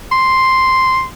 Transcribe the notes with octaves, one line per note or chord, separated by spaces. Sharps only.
C6